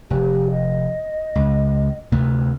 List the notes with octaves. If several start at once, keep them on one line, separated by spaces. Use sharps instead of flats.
F1 G4
D#5
C#2
D2 C3 A3